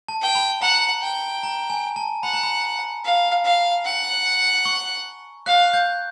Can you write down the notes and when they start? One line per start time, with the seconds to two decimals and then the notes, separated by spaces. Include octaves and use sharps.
0.08 A5
0.22 G5
0.35 B5
0.62 F#5 A#5
1.02 G5
1.43 A#5
1.70 G#5
1.96 A5
2.23 F#5 B5
2.33 A#5
2.43 B5
3.04 F5
3.44 F5
3.85 F#5
4.65 C#6
5.46 F5 F#6
5.73 G6